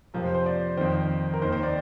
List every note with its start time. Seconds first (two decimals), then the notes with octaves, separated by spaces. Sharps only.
0.14 F2 C3 F3 A#4
0.24 C5
0.34 C5
0.46 D5
0.77 F2 D#3 C5
1.34 A#4
1.42 D#2 D#3 C5
1.52 C5
1.63 D5